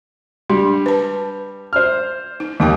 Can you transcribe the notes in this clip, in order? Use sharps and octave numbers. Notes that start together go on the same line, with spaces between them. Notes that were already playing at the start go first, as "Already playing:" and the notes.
G3 D4
B4 A5
C5 F6
D#4
D#2 E3 D#4 G5